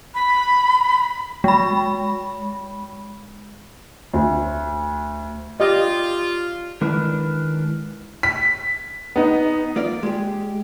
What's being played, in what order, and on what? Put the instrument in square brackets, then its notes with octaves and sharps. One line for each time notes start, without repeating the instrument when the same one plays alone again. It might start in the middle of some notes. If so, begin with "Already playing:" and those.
[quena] B5
[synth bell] G#3 B5
[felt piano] D2
[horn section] F4 [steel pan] G4 D5 D#5
[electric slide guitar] D#3 G#3 D4 E4 A#4 B4
[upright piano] B6
B3 D#4
[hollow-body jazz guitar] A#3 F4 D5
G#3 G4